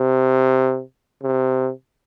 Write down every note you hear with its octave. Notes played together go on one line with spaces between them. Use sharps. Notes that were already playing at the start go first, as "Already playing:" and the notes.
Already playing: C3
C3